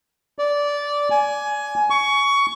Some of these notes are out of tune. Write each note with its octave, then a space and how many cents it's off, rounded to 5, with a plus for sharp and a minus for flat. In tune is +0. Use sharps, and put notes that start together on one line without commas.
D5 -15
G#5 +15
C#6 +20